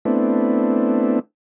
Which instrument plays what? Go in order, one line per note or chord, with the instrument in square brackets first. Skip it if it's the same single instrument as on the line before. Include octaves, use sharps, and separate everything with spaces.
[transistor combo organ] A3 B3 C4 D4 E4